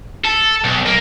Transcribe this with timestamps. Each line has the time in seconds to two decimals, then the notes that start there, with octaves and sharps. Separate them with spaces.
0.25 A4
0.64 B1
0.86 A#3